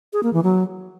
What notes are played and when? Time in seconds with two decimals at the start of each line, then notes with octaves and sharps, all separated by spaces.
0.13 G#4
0.23 A#3
0.33 E3
0.44 F#3